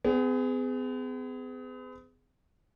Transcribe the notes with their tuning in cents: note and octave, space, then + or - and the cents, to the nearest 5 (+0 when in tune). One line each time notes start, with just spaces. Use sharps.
B3 +45 G#4 -5